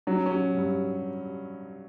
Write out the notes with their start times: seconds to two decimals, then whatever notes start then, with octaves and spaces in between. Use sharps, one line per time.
0.07 F#3 C#4
0.26 C#4
0.32 F#3
0.57 G2